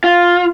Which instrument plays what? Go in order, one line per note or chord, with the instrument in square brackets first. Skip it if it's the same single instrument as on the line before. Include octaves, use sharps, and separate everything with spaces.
[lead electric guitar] F4